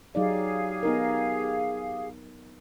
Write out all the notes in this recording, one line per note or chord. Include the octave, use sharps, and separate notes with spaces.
F#3 D#4 G4 G#4 D5 F5
B3 D#4 A#4